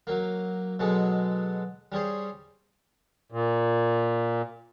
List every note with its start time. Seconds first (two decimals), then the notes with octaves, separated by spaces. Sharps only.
0.07 F#3 A#3
0.79 B2 F#3 G#3 A4
1.92 G3 C#4 G#4 C5
3.32 A#2